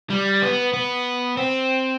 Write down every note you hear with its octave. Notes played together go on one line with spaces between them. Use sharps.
G3
B3
B3
C4